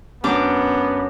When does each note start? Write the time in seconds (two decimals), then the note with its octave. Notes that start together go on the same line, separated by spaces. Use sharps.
0.24 F#2 B3 D4 D6